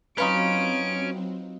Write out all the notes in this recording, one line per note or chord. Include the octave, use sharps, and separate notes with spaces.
F#3 C4 C#4 D#4 F4 B4 D7